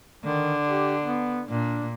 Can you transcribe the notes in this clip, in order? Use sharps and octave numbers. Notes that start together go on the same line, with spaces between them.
D3 D#3
G4
B3
A#2 D4